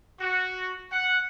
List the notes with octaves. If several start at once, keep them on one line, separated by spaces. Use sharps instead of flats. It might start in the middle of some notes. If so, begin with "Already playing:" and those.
F#4
F#5